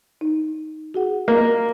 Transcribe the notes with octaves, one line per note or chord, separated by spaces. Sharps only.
D#4
F#4 G#4 F#5
A#3 F4 A#4 D#5